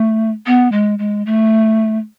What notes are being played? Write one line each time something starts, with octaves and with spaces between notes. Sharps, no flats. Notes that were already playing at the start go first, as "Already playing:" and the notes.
Already playing: A3
B3
G#3
G#3
A3